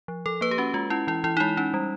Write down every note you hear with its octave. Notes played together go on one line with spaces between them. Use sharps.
F3
F3 A4
A#3 B4
G4
C#4 F#4
G#3 F4
C#4 E4
E3 E4
E3 E4
D#4
G#3 E4
C#4 D#4
G3